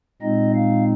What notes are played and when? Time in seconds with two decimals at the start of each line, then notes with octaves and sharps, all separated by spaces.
0.22 A#2 G#3 C4 D#4 D#5
0.55 F5